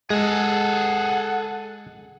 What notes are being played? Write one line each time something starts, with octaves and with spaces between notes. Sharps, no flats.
G#3 G#4 A4 F#5